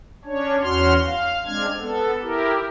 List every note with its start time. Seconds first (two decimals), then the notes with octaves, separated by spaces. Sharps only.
0.25 C#4 D4 C#5
0.62 E2 C#4 F#4 C6 F6
1.05 F5
1.46 G#3 C4 D4 F6 G#6
1.79 B3 A4
2.22 E4 G4 A#4